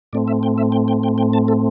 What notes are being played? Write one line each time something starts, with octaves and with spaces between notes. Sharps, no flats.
A2 A3 C4 D5
E5
G5
E5
G5
G5
G5
G5
A5
A4